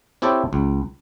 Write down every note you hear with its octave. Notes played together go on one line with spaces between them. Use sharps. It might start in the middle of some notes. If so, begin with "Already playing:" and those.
C4 E4 G4 A4 C#5 G5
C#2